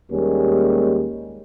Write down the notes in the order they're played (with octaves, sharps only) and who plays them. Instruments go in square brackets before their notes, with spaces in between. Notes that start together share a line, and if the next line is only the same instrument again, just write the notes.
[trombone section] D#2 G3 G#3 A#3 C#4